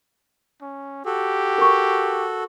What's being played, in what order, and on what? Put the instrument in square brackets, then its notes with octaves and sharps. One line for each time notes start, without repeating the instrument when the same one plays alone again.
[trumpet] C#4
[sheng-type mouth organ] F#4 A4 [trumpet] G4
[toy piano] A#4 C#6